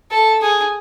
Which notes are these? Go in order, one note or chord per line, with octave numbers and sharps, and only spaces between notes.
A4
G#4